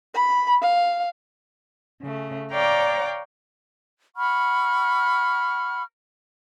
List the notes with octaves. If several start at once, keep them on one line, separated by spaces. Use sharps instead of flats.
B5
F5
C#3 A3
C#5 D5 F5 G5 A#5 D6
F#5 B5 C#6 F6